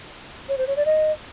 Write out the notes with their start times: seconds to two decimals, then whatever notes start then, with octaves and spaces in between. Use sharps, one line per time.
0.49 C#5
0.58 C5
0.67 C#5
0.77 D5
0.86 D#5